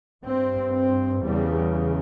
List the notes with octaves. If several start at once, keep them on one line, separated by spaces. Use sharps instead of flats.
G2 C4
C4
E2 C#3 G3